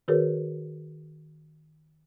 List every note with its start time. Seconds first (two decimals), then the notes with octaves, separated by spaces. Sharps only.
0.08 D#3 F#4 G#4 A#4 B4 C#5